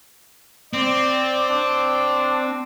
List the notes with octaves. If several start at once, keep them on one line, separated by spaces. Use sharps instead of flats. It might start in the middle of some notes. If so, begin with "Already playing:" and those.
C4 D5
D4